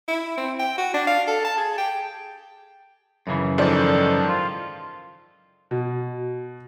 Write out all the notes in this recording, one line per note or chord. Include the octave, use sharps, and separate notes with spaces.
E4
C4
G5
F#4
D4
F5
A4
A5
G#4
G5
F#2 C#3 E3
G#2 D#3 F3 A4 C5 D5
F4
B2